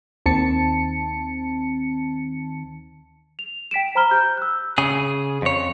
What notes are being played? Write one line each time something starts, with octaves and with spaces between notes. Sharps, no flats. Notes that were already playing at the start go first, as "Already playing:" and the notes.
D#2 D#3 C4 A5 C#7
F7
G5 B6 D7 E7
C5 A#5 B5 F6 G7
G4 G6
E6 F#6
C#3 G#4
F2 C#5